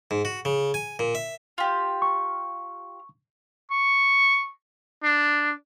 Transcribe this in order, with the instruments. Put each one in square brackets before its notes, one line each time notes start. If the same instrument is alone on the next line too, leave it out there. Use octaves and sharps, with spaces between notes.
[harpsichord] G#2
F#4
C#3
G#5
A#2
E5
[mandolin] F4 G4
[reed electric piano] C#6
[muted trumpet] C#6
D4